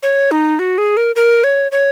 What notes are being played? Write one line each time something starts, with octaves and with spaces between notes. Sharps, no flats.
C#5
D#4
F#4
G#4
A#4
A#4
C#5
C#5